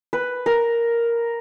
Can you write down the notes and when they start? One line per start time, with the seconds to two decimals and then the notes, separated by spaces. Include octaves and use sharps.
0.13 B4
0.46 A#4